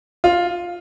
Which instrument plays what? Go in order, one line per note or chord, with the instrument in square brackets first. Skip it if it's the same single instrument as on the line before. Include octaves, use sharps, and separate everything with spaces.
[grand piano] F4